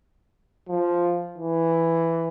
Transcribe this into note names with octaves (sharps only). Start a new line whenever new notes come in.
F3
E3